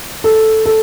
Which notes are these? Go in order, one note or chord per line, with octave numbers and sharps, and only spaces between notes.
A4
A4